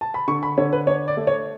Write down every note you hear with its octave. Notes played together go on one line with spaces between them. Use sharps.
A5
B5
D3 C#6
B5
D3 C#5
B4
D4 C#5
D5
A3
C#5